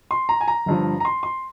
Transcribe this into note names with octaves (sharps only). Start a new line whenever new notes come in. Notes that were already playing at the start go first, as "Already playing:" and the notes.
C6
A#5
G#5
A#5
G1 G2 F3
A#5
C6
C6